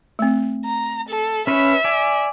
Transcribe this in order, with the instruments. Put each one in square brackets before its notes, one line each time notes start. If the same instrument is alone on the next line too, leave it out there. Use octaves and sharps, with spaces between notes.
[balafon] A3 C4
[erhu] A#5
A4
[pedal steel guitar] C#4 B4 C#5 [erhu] E5
[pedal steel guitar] D5 G#5